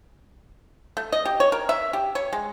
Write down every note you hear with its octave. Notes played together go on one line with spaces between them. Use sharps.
A3
D#5
G4
C#5
A#4
E5
G4
C#5
G#3